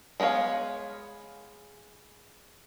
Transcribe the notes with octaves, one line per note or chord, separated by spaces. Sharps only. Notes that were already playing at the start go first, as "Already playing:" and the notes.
G#3 B3 F#4 C#5 F5